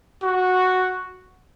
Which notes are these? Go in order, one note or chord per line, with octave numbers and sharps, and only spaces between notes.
F#4